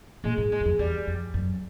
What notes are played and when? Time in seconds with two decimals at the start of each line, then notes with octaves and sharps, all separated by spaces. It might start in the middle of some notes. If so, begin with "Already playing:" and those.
0.24 A#2 G#3
0.38 G#2
0.52 G#3
0.60 F#2
0.65 F2
0.79 E2 G3
1.07 F2
1.34 F#2